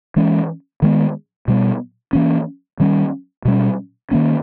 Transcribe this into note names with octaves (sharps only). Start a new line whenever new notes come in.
E3 G#3 C#4
D#3 G#3 B3
B2 G3 B3
E3 A#3 C#4
D#3 G3 C#4
B2 G3 C#4
D#3 A#3 C#4